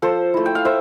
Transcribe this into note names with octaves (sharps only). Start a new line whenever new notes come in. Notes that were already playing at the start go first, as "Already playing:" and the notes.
F3 A4 C5
A3 E4
G5
F5
A3 C5 E5